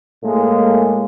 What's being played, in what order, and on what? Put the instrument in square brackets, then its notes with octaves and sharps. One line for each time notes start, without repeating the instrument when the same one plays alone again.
[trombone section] A2 G#3 A#3